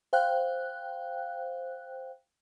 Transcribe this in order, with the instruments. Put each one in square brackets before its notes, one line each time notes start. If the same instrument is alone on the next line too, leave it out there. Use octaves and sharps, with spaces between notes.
[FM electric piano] C5 F5 G5 F#6